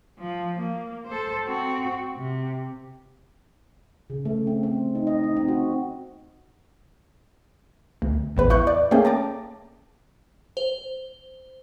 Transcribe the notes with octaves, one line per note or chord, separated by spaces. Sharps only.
F3
A#3
A4 C5
C4 F#4
C3
C#3
A3
C4
C4
D#4
D#5
D#4
C4
F#4
D2
A1 E2 B4
E4 C#6 F#6 G6
D5
A3 A#3 C#4 G#4 G5
A5 A#5 D6
C5